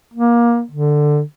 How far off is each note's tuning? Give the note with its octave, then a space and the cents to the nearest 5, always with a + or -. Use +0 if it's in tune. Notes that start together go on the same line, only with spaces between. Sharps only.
A#3 +20
D3 +10